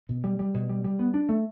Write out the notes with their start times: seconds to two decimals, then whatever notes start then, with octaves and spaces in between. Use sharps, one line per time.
0.09 B2
0.24 G3
0.39 G3
0.54 B2
0.69 G3
0.84 G3
0.99 B3
1.14 D4
1.29 A3